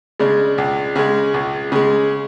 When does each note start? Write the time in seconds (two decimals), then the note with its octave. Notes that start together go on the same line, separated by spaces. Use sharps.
0.19 C#3 G#3 D4
0.58 C#2
0.96 C#3 G#3
1.34 C#2
1.72 C#3 G#3